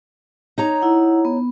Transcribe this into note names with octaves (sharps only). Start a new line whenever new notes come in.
D#4 C#5 A#5
E4 F#5
B3